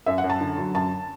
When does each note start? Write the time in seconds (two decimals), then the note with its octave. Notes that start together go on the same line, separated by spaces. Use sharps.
0.06 F#2 E5
0.18 F#5
0.24 F#2
0.30 A5
0.41 D3
0.58 F#3
0.75 F#2 A5